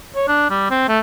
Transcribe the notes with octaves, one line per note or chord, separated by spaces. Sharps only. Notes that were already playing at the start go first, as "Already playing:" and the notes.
C#5
D4
G3
C4
A3